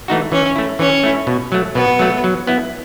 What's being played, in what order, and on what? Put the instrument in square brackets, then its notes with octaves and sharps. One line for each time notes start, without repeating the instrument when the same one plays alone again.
[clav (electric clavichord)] E3 A3 D#4 F#4
[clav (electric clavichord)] E3 [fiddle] C#4
[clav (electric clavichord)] A3 E4
[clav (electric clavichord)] E3 [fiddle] C#4
[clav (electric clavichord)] A3 E4
B2
F#3 A3
[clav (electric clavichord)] B2 [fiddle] B3
[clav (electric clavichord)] F#3 A3
F#3
B3 E4